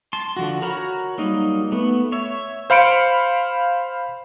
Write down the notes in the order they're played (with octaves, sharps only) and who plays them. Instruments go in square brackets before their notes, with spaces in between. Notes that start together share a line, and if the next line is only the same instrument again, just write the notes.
[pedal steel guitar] A5 C6
D3 F3 F#4
F#4 A#4 C#5 A#5 B5
F#3 G3 A#3 D#4
A3 B3
C#5 E5
[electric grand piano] C5 F5 B5 C#7 D7